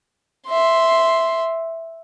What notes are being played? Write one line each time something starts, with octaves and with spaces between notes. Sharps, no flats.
E5 C6